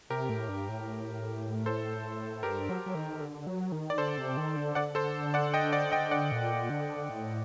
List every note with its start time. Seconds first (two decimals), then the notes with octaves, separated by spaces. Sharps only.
0.10 C3 G4 A#4
0.29 A2
0.49 G2
0.69 A2
1.66 A4 C5
2.43 G2 G4 A#4
2.69 F#3
2.86 F#3
2.95 D#3
3.21 D3
3.47 F#3
3.72 D#3
3.90 D5
3.98 D3 A4 C5
4.17 C3
4.37 D#3
4.56 D3
4.75 D3 D5 F#5
4.95 A4 C5
5.34 D5 F#5
5.54 D#5 G5
5.72 D5 F#5
5.92 D#5 G5
6.11 D5 F#5
6.32 A#2
6.70 D3
7.09 A2